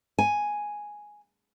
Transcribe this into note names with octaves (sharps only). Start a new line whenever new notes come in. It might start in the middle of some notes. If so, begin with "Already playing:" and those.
G#5